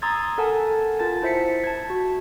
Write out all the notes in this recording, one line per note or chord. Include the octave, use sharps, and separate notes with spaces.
A#5 C6 D#6 E6 G#6 A6
A4 A#4 F#5 G#5 A5
F4 A#4 A5 A6
E4 C5 E5 B6 C#7
A5 G#6
F#4